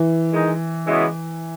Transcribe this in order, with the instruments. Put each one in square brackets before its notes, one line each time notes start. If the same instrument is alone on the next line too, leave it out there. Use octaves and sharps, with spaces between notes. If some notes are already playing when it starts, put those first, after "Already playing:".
Already playing: [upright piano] E3
[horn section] D#3 G#3 D#4
C#3 E3 G#3 B3 F#4